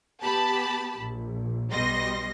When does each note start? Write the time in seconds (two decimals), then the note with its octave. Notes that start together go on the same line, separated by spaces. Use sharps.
0.22 B3 G4 A5 B5
0.98 A#1
1.71 B1 B2 G3 D#5 C6 A#6